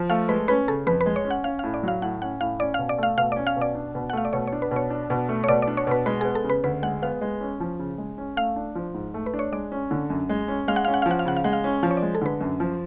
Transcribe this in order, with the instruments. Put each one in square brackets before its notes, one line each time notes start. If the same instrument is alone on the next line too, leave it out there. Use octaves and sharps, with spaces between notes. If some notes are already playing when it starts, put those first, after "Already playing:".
Already playing: [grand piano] F3
[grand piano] A3 [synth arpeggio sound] F5
[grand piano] G#3 [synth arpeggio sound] B4
[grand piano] C#4 [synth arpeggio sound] B4
[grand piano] C#3 [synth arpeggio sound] A4
[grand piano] F2 [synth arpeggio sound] B4
[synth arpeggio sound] B4
[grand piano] G#3
[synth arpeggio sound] C#5
[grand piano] C#4
[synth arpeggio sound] F#5
[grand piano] C#4 [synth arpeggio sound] F5
[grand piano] A2 [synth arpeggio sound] F5
[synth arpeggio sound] D5
[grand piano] F#3 [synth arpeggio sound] F5
[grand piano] A2 [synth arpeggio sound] F#5
[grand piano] C#4 [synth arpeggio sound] F#5
[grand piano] A2 [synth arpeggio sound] F5
[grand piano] C#4 [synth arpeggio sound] D5
[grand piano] B2 [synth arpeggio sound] F5
[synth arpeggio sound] D5
[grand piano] A3 [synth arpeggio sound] F5
[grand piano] B2 [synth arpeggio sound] F5
[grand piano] C#4 [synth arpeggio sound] D5
[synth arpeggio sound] F5
[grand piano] B2
[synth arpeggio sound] D5
[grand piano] D4
B2
[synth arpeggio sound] F#5
[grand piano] A3 [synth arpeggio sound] F5
[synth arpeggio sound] D5
[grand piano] B2 [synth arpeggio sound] C#5
[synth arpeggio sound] C#5
[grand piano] D4
[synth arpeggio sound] B4
[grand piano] B2
[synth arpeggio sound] C#5
[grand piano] D4
B2
A3
[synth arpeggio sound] C#5
[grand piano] B2 [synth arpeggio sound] D5
[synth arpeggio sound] D5
[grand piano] D4
[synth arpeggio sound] C#5
[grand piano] B2 [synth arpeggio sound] B4
[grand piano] G#3 [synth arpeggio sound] B4
[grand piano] B3 [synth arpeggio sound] G#4
[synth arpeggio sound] A4
[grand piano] C#3
[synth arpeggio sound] B4
[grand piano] D2 [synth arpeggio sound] B4
[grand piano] G#3 [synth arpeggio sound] F#5
[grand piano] B3 [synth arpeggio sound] F5
[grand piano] G#3
C#4
F3
C#3
G#3
C#4
[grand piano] A3 [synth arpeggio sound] F5
[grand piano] D4
F3
G#2
A3
[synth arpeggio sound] B4
[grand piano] D4
[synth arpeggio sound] C#5
[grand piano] G#3 [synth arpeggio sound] D5
[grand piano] C#4
D3
F#2
G#3
C#4
[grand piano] G#3 [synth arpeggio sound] F5
[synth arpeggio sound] F#5
[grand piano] C#4 [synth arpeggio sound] F5
[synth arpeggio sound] F#5
F5
[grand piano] F3
[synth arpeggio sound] F#5
F5
[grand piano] C#3 [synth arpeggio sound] F#5
[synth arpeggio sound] F5
[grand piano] G#3 [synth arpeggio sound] F#5
[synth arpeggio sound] F5
[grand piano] C#4
[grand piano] F3 [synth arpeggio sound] F5
[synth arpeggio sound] C#5
D5
[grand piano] G#3
[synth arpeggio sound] A4
[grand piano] D3 [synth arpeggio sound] B4
[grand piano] F#2
F3